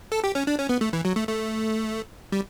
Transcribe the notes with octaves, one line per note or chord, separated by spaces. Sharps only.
A4
G4
C#4
D4
C#4
B3
A3
E3
F#3
A3
A3
G3